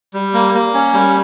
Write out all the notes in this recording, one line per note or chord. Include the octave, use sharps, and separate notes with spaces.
G3
A#3
A#3
C#4
G3